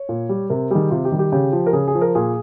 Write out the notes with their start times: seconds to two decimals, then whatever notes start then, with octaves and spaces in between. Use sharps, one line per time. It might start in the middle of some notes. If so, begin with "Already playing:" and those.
Already playing: C#5
0.09 A#2
0.29 G3
0.50 C3 A#4
0.70 D#3 G3 G#4
0.91 C3 F4
1.05 G4
1.12 D#3 G3
1.19 G4
1.32 C#3 G4
1.53 F3
1.66 A#4
1.73 C#3 G#4
1.87 G#4
1.95 F3
2.01 A#4
2.15 A#2 G#4